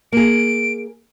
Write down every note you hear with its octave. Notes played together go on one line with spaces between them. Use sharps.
A#3 G#4 D7